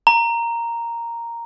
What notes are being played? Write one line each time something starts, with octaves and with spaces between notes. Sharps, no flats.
A#5